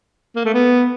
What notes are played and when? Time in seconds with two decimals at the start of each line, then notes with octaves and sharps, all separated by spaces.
0.36 A#3
0.45 A3
0.54 B3